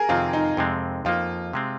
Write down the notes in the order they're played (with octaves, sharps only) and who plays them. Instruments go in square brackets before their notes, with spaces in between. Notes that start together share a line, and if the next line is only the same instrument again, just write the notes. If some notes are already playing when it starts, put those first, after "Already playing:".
Already playing: [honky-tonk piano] G#4 A#4
[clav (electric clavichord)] F2 C3 D#3 C4 [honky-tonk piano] F4
[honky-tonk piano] D#4
[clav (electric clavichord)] F2 C3 G#3 C4
[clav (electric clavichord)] F2 F3 A#3 [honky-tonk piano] F4
[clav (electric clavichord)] C3 G#3 C4